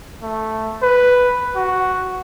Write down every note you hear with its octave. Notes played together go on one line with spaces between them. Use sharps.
A3
B4
F#4